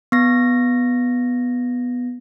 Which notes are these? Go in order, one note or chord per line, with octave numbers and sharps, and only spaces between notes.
B3 A#6